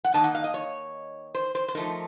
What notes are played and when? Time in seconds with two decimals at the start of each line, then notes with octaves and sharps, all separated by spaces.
0.05 F#5
0.14 D#3 A#3 D#4 A5
0.24 F#5
0.35 F5
0.44 D#5
0.54 C#5
1.35 C5
1.55 C5
1.68 C5
1.75 F3 A3 D#4 A#4